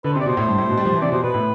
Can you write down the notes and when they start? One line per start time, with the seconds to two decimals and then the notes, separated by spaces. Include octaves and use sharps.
0.04 D3 B4
0.13 C3 C5
0.20 D5
0.26 B2 C5
0.37 A2
0.48 G2
0.58 A2
0.70 B2
0.77 G3
0.85 F3
0.94 E3
1.02 C3 D5
1.12 B2 C5
1.23 B2 B4
1.34 A2